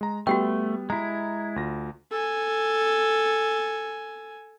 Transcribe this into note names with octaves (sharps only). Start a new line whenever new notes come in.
G#3 A#5
G3 A3 B3 F#4 G4 G5
G#3 E4 A#5
D2 F4 A#6
A4 G#5